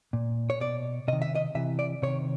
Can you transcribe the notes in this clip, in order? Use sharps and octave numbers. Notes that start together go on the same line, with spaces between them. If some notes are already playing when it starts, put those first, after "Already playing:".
A#2
C#5
B2 D5
C3 D#3 D#5
E5
D#5
C3 E3 E5
D5
C3 D#3 C#5